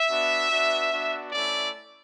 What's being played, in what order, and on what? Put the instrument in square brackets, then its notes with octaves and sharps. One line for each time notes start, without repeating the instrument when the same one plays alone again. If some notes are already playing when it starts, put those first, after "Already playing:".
Already playing: [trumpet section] E5
B3 D4 F#4
B3 D4 F#4
B3 D4 F#4
A3 C#4 E4 D5